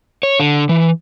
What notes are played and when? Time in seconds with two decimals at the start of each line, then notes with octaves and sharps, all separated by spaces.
0.23 C#5
0.40 D3
0.69 E3